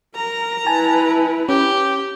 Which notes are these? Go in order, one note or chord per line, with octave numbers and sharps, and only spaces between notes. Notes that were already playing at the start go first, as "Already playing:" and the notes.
A#4 A#5
E4 B4 G#5 A5
C#4 G4